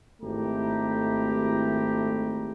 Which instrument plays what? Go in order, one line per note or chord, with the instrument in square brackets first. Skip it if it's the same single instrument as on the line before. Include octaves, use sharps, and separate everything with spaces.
[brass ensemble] G#1 A3 E4 G4 A#5